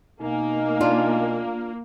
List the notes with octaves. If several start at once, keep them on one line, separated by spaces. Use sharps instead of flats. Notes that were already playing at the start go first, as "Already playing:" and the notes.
B2 A#3 D#4 D#5 G#5
D4 F4